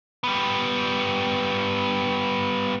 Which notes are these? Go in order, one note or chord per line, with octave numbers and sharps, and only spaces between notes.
G3 B3